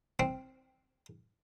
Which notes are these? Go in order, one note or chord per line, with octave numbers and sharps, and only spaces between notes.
C4